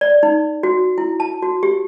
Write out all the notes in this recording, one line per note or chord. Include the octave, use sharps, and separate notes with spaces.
D5
D#4
F#4
E4
A5
F#4
G4